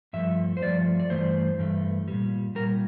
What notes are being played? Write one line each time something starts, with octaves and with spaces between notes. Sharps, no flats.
G2 F3 A3 E5
C5
G2 F3 A3 D5
D5
G2 E3 A3 C5
G2 E3 A3
A#2 G3
G3 A#4
A#2